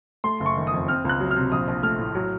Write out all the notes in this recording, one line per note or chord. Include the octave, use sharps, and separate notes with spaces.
A3 C6
F#1
C#6
D#3
D#6
F2
C4 F6
C#2 F#6
F#3
F6
C3
A#1 D#6
A#1
A3 F6
A2
F#3